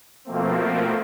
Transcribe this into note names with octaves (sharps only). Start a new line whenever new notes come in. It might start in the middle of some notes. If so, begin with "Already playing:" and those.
B2 F3 A3 A#3 C4